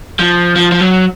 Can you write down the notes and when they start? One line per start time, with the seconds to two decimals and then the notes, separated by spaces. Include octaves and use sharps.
0.19 F3
0.56 F3
0.72 F3
0.80 F#3